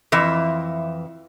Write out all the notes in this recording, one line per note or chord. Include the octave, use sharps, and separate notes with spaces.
F2 E3 E5